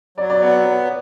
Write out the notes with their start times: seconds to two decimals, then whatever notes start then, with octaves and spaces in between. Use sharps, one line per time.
0.18 F#3 D5
0.30 D5
0.41 B3 C#5